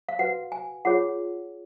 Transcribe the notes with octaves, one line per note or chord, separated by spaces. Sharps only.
F5
F#4 B4 F#5
G#5
F4 G#4 C#5 F#5